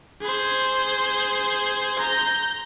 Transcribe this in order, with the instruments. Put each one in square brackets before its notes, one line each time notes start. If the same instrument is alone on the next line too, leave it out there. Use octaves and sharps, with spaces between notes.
[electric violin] G#4 C5
A#5 G6